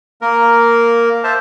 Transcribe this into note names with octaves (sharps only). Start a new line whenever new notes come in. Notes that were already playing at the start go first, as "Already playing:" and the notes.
A#3 A#4
C5 E5 A5